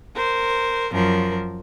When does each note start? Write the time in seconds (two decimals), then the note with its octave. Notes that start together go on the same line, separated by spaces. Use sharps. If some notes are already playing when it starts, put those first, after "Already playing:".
0.15 A#4 C5
0.92 F#2 F3 A#4